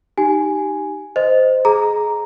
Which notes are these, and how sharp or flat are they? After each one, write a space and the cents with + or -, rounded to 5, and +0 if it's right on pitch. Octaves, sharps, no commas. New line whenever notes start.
D#4 +0 G4 -10 G#5 +0
C5 -10 D#5 +0
G#4 +15 A#5 +0